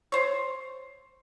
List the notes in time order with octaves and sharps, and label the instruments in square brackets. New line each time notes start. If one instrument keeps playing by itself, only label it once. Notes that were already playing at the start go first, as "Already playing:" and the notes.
[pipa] C5 C#5